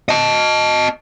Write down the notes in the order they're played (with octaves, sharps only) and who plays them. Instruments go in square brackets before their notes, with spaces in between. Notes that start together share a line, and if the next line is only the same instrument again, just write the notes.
[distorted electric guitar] D#5 A5